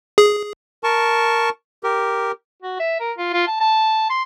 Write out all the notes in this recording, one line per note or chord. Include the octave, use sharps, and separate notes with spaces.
G#4
A#4 A5 C#6
G4 A#4
F#4
E5
A#4
F4
F4
A5
A5
C6